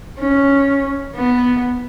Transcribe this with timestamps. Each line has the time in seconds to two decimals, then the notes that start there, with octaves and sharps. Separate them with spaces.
0.19 C#4
1.16 B3